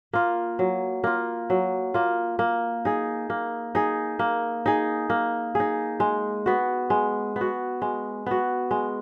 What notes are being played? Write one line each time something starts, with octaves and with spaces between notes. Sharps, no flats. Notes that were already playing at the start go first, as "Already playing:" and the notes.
A#3 F4
F#3
A#3 F4
F#3
A#3 F4
A#3
D#4 G#4
A#3
D#4 G#4
A#3
D#4 G#4
A#3
D#4 G#4
G#3
B3 F#4
G#3
B3
F#4
G#3
B3 F#4
G#3